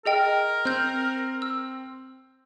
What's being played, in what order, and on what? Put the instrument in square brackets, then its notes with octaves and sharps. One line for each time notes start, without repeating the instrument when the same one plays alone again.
[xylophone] G#4 D#5 G5 [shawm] A#4
[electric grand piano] C4 [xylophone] F6 G6
[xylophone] E6